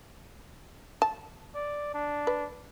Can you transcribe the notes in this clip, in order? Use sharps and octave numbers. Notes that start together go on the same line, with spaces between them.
A5
D5
D4
B4